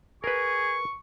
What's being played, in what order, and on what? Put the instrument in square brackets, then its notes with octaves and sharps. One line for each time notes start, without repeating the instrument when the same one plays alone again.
[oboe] G#4 [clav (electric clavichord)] A#4 B4 [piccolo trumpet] C#6